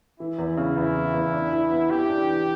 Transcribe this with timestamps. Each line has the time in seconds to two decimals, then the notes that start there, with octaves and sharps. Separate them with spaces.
0.19 E3 E4
0.39 E2
0.57 C#3
0.77 E2 E4
0.95 E3
1.14 E2
1.34 D4
1.52 E3
1.72 B3
1.90 E3 G4
2.09 D4
2.28 E3